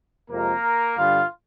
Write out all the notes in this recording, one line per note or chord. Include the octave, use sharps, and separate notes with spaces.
F2 C3 F3 G#3 A#3 A#4
G2 D3 G3 F4 F5